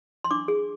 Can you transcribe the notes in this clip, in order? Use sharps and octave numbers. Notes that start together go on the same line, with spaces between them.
C6
D4 D6
G#4